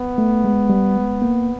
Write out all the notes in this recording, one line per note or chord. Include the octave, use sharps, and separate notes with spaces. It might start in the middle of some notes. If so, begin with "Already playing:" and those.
Already playing: B3
A3
G#3
G3
G#3
A#3